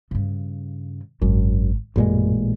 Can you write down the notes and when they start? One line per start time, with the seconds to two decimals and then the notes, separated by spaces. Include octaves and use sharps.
0.11 G2 C#3
1.22 G#1 F#2
1.96 A1 F#2 A#2 G#3